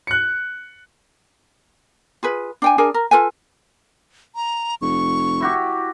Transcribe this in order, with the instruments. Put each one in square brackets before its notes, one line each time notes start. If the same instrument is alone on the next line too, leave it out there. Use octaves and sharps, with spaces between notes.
[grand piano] F#6 C#7
[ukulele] F4 G#4 B4
D4 G5 G#5
D4 G#4 A#4 G#5
A#4
F4 A4 B4 G#5
[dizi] A#5
[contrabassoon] F1 [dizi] C#6
[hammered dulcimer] E4 F#4 G4